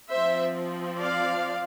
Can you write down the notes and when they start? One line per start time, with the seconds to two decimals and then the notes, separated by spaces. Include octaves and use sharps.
0.11 F3 C4 C5 E5
0.99 D5 F5